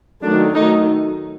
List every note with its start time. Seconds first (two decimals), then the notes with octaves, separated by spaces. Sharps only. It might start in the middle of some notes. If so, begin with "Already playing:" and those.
0.22 D#3 F#3 A3 D4
0.55 D#3 F#3 A3 D#4